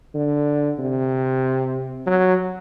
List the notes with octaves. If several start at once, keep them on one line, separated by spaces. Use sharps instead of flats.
D3
C3
F#3